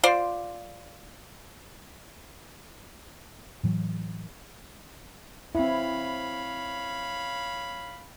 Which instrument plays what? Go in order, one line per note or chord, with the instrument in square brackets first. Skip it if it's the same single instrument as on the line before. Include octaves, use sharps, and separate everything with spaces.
[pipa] F4 C5 D5
[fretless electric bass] A2 E3 F#3
[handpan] C4 E4 [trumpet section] C#5 F5 B5